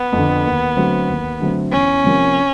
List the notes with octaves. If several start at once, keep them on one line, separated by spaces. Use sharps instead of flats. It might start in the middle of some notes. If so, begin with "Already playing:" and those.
Already playing: B3
F2 D3
D#2
D3 F#3 A3 C4
D#2
D3 F#3 A3 C4
E2 C#4
C3 F3 A#3